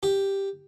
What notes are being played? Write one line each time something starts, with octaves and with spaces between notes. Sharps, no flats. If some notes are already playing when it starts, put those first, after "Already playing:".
G4